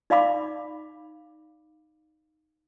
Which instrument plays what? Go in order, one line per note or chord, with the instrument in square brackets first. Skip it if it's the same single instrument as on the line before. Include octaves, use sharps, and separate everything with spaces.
[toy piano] D#4 D5 F5 B5 D6